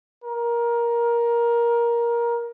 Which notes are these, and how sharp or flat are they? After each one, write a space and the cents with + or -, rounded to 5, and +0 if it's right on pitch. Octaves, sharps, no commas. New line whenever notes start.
A#4 +15